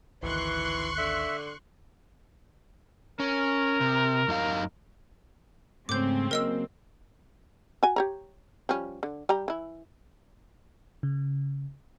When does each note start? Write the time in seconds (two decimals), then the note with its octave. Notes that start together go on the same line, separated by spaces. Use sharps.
0.23 G#1 D2 D#3 E3 C6 C#6 F#6
0.98 D3 E5
3.20 C#4 A#4
3.81 C3
4.28 F#2 D#4 F5
5.89 G#2 C#3 A3 C4 D6 G6
6.31 F#3 A#3 A#4 D#5 E6
7.83 F#4 G#5
7.96 G4 C#5 A#5
8.69 F3 G3 C#4
9.03 D3
9.29 G3 G4 A#5
9.48 E3 E4
11.03 C#3